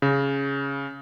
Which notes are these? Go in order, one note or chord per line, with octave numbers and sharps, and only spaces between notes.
C#3